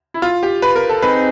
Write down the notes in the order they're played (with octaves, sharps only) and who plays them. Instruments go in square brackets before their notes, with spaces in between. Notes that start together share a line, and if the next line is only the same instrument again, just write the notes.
[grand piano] E4
F4
G4
B4
A#4
A4
[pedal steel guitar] C4 D#4 G#4 [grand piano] B4